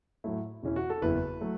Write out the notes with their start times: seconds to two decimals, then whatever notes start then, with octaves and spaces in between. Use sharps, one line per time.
0.24 A2 F#3 A3 E4
0.63 E1 E2 E3 C#4 E4
0.76 F#4
0.90 A4
1.02 F#1 E2 E3 B3 E4 B4
1.41 F#3 A3